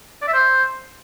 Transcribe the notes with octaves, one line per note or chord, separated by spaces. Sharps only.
D5
E5
C5